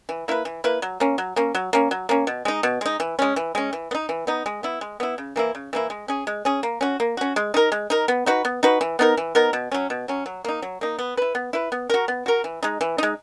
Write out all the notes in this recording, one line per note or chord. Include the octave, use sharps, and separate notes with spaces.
E3
A#3 E4 B4
E3
A#3 E4 B4
F#3
A#3 C#4
F#3
A#3 C#4
F#3
A#3 C#4
F#3
A#3 C#4
B2
G#3 D#4
B2
G#3 D#4
E3
G#3 C#4
E3
G#3 C#4
E3
B3
D#4
E3
B3 D#4
G#3
B3 E4
G#3
B3 E4
C#3
E3 A#3 E4
C#3
E3 A#3 E4
G#3
C#4 G#4
G#3
C#4 G#4
A#3
C#4 F#4
A#3
C#4 F#4
G#3
D#4 A#4
G#3
D#4 A#4
B3
D#4 F#4 B4
B3
D#4 F#4 B4
E3
B3 D#4 A#4
E3
B3 D#4 A#4
B2
F#3 C#4
B2
F#3 C#4
F#3
A#3 D#4
F#3
A#3 D#4
B3
E4 B4
B3
E4 B4
B3
F#4 A#4
B3
F#4 A#4
E3
G#3 D#4
E3
G#3 D#4